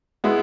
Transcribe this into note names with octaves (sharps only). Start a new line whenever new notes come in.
G#3 B3 E4